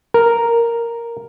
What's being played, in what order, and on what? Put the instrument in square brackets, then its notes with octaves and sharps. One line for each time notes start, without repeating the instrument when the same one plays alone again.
[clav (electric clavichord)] A#4